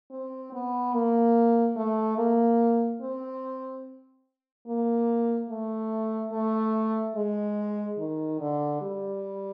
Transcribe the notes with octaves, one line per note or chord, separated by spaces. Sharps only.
C4
B3
A#3
A3
A#3
C4
A#3
A3
A3
G#3
D#3
D3
G3